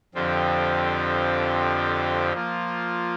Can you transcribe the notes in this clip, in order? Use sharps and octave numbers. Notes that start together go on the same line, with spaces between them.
F2 D3 F3 C4 G4
F3 A#3 F4